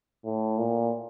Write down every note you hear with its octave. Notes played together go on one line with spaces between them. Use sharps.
A2
A#2